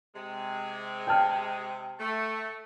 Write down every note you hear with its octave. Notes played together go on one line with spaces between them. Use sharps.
C3 G#3
G5 A5 F6
A3